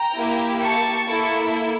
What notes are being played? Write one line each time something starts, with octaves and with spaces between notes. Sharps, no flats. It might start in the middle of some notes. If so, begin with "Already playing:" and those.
Already playing: G5 A#5
A#3 E4 G4
A5 C#6
A#3 E4 A4